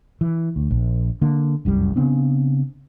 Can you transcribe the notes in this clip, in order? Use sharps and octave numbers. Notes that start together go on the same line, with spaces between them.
E3
D2
A#1
D3 A#3
F1 C2 F#2 G3
C#3 B3 C4 D4